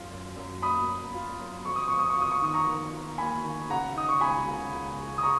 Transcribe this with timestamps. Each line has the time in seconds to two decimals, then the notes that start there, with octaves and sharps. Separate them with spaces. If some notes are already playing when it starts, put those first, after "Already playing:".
Already playing: F#2 F4
0.11 F#2
0.36 F#2
0.62 A#3 B5 D#6
0.88 F#2
1.14 F4
1.40 F#2
1.65 F2 C#6
1.76 D#6
1.88 F2 C#6
1.99 D#6
2.10 C#6
2.16 F4
2.21 D#6
2.31 C#6
2.42 D#3 D#6
2.54 A#5 C#6
2.67 D#3
2.92 F4
3.18 A#3 G#5 B5
3.44 D#3
3.70 C#3 F#5 A#5
3.96 D#4 D#6
4.08 C#6
4.20 C#2 G#5 B5
4.46 C#3
4.73 C#2
4.98 G#3
5.18 D#6
5.23 A#5 C#6